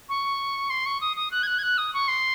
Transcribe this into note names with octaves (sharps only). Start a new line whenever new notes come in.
C#6
C6
C#6
D#6
D#6
F#6
G#6
F#6
G#6
F#6
D#6
C#6
C6